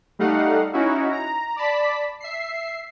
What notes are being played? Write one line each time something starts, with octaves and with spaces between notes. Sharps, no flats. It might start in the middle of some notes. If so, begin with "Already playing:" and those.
G3 A3 D#4 F5 F#5
C#4 D#4 E4 F#4
A#5
D5 A5 B5 B6
E5 C7